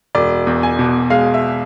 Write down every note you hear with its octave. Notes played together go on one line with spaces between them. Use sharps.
E1 D5
E2
G#5
B2
G#3 F5
E5